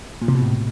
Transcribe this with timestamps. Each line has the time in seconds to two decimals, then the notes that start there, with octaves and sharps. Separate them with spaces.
0.21 A#2
0.28 C3
0.35 B2
0.42 A2